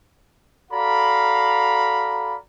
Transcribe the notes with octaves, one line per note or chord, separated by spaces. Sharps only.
F#4 A4 D5 F5 A#5 B5